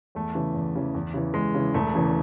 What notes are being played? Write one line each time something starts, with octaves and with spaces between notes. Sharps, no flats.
E2 A3
C#3 E3
E2
C#3 E3
E2
C#3 E3
E2 G#3
C#3 E3
E1 A3
E2 C#3 E3